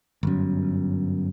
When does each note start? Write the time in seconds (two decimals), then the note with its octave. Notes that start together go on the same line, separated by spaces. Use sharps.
0.23 G1 F#2